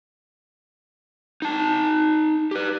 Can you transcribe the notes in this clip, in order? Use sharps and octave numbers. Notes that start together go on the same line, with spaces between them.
D#4 A5
G4 B4